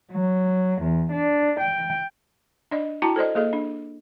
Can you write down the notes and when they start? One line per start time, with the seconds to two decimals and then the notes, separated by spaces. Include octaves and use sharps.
0.10 F#3
0.80 E2
1.11 D4
1.58 G5
2.71 D4 D5 D#5
3.02 E4 F#4 G5 A5 A#5
3.16 A4 C5 D5 D#5
3.35 A#3 G#4 A4 D#5
3.53 D4